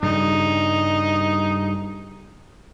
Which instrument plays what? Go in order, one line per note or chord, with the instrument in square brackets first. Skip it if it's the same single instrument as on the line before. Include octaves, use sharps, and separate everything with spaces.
[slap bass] G2 C#3 G3 [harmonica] D#4